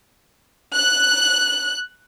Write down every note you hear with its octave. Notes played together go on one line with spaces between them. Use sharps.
F#6